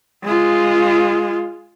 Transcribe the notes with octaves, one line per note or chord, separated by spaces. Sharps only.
G#3 F4